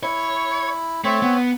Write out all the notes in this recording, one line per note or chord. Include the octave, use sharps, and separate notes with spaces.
E4 C#5
A3 C4 C#5
B3